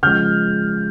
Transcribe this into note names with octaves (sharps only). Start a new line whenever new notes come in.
C#3 F3 G#3 F6 G6